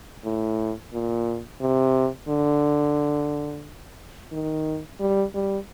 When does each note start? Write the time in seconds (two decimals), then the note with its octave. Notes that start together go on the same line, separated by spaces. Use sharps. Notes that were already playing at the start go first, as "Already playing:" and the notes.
0.25 A2
0.93 A#2
1.61 C3
2.28 D3
4.32 D#3
5.00 G3
5.34 G3